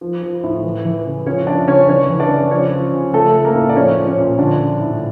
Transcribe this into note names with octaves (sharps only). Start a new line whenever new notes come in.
F3
F3
A2
E3
E3
C#3
F3 C#4 C#5
F3 D4 D5
C#3 C#4 C#5
E3 C#4 C#5
E3
D4 D5
C#3
F3 C#4 C#5
F3
C#3
F3 A3 A4
F3
A#3 A#4
A2
D5
F3 C#4 C#5
F3
C#4 C#5
A#2
D3 F3 D4
F3
A2